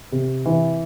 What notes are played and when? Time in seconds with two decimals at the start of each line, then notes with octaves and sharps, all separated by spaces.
0.12 C3
0.46 E3